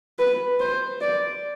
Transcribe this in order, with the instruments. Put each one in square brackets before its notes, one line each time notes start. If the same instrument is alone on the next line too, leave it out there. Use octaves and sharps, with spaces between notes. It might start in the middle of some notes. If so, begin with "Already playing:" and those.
[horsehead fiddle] B4
C5
D5